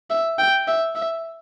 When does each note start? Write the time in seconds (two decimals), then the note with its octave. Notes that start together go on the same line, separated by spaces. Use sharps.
0.10 E5
0.38 G5
0.68 E5
0.96 E5